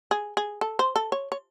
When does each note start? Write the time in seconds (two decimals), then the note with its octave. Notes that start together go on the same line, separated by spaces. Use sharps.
0.11 G#4
0.37 G#4
0.61 A4
0.79 C5
0.96 A4
1.12 C#5
1.32 C#5